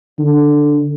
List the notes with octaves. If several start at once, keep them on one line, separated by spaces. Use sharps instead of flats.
D3